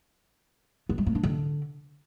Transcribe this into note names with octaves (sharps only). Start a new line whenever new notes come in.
B3
G#3
A#3
D4
D3